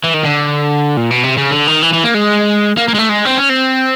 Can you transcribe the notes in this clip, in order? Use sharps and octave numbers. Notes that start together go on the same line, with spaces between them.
E3
D#3
D3
A#2
B2
C3
C#3
D3
D#3
E3
E3
A#3
G#3
A#3
A#3
G#3
A3
G#3
C4
C#4
C4